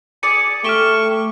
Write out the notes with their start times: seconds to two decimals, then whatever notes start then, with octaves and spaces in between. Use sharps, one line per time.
0.23 G#4 D5 G#5 C#7
0.64 A3 G4 C#6 F6 E7 G7